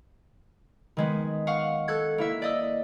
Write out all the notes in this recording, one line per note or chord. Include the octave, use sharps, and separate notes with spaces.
D#3 G#3 B3
F5 F#5 C#6
A4 F#6 G#6
A#3 E4 E5
D5 D#5 E6